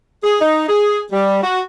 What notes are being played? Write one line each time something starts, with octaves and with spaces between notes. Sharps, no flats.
G#4
D#4
G#4
G3
F#4